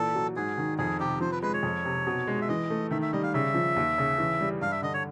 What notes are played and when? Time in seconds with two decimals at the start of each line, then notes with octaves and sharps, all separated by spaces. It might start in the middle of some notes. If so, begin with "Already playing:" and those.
Already playing: A#2 E3 A4
0.15 F#3
0.36 G#2 G#4
0.58 D#3
0.78 F2 G#4
1.00 C3 G4
1.20 F3 C5
1.32 B4
1.43 G#3 B4
1.53 C#5
1.63 F2
1.85 C3
2.07 B2
2.27 G#3
2.41 E5
2.49 E3 D#5
2.70 A3
2.91 D#3 E5
3.02 E5
3.13 G3 D#5
3.23 F5
3.34 C#3 E5
3.54 F3
3.76 D#2
3.98 C#3
4.18 E3
4.41 G3
4.62 G2 F5
4.72 E5
4.82 D3 D#5
4.94 C#5